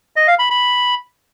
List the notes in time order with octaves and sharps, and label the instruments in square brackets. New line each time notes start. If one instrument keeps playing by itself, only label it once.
[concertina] D#5
F5
B5
B5